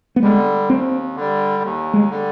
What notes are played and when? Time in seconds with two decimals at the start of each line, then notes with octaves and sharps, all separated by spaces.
0.16 B3
0.22 D3 G3 G#3
0.69 D#2 C4
1.16 D3 G3
1.63 D#2
1.94 G#3
2.10 D3 G3